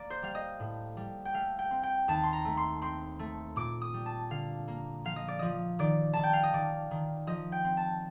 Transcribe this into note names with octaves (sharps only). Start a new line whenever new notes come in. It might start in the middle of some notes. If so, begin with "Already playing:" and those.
Already playing: A#3 D5
C5
G3 F5
D#5
A2
G3
G5
A3 F5
G5
C4
G5
D#2 A5
C6
A#5
A3
C6
C4 C6
A3
A#2 D6
D#6
G3
A5
D3 F5
A#3
F3 F5
D#5
D5
F3 D#5
D#3 D5
D#3 A5
G5
F5
D#5
D#3 D5
D#3
F3 D#5
G5
C4
A5